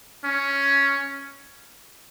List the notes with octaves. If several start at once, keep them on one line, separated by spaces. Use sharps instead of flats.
C#4